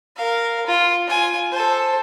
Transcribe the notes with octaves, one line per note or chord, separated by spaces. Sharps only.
A#4 F5
F4
F4 G#5
A4 C5